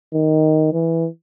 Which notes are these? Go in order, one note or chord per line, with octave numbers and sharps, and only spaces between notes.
D#3
E3